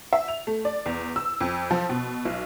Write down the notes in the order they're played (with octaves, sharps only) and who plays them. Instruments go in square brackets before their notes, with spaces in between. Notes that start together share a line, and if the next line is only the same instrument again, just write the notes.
[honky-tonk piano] E5
F7
A3
D5
E2
E6
F2
F3
B2
B1